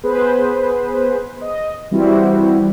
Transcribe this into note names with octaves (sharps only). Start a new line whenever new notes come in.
B3 G#4 B4 C5
D#5
E3 G3 C4 E4 F#4